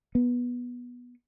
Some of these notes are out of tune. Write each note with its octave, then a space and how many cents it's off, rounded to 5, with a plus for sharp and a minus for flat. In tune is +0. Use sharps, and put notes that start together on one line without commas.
B3 -15